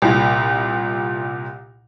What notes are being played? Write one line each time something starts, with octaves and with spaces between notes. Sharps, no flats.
C2 A#2